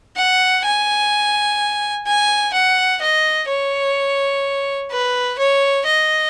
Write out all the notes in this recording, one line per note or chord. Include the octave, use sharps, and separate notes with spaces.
F#5
G#5
G#5
F#5
D#5
C#5
B4
C#5
D#5